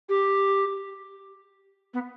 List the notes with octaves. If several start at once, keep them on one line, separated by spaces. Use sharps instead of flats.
G4
B3